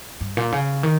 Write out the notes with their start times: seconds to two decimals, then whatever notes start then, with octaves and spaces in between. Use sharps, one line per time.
0.21 G2
0.37 A#2
0.52 C#3
0.83 D#3